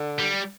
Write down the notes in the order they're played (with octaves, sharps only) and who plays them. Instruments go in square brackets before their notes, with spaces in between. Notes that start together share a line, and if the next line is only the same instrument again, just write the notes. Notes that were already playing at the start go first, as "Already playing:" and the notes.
Already playing: [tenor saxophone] D3
[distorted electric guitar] G3